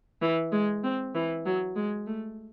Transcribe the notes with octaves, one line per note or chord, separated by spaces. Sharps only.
E3
G#3
C4
E3
F#3
G#3
A3